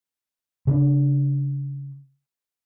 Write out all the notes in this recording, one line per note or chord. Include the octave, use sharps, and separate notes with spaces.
C#3 C#4 D4